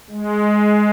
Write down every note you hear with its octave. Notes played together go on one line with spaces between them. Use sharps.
G#3